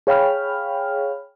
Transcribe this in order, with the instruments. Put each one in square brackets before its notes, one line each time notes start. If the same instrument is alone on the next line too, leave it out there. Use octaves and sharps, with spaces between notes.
[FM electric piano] G#4 C#5 F5 G5 B5 F6